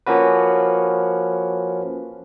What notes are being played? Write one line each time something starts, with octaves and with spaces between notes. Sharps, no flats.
F3 A#3 C#4 F#4 B4